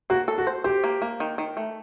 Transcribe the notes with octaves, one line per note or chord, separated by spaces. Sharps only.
A#3 F#4
A4
F#4
C5
G4 C5
A#3
A#3
D#3
D#3
A3